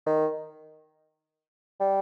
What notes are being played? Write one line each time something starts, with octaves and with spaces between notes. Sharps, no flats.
D#3
G3